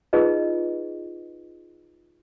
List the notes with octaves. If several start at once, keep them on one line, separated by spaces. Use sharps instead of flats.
D#4 F4 G#4 B4 D#5